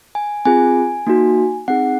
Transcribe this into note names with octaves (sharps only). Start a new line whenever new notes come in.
G#5
C4 F4 G#4 G#5
A#3 D#4 F#4
C4 D#4 G#4 F#5